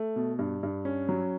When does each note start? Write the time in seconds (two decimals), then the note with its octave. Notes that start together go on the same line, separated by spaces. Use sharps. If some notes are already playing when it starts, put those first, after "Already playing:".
Already playing: A3
0.16 B2
0.39 G2
0.63 G2
0.85 C#4
1.09 F#3